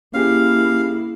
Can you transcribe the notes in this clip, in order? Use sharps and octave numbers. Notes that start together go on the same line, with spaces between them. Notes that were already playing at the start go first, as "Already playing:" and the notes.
A#3 C#4 E4 G4 G#4 F5